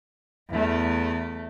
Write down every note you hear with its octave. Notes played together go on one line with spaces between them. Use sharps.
E2 A3